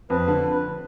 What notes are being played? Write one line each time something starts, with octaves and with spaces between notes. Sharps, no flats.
F2 B4
D3